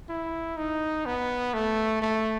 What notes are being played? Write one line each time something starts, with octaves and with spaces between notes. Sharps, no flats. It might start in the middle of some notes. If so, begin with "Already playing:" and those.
E4
D#4
B3
A3
A3